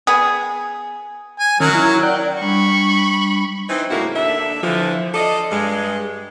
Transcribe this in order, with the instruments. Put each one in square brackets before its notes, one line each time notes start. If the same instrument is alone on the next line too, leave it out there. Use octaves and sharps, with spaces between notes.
[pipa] B3 G#4
[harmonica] G#5
[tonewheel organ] D#3 C#4 [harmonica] F#3 A#4
[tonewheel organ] E4
D5 F#5 G5
[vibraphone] G3 D4 [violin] B5 C#6
[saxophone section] E3 C4 D#4
F2 A2 C#3 A#3 E4 F#4
D#2 D4 A4 E5
D3 E3 F3
F4 A4 D5 D#5
G2 G#3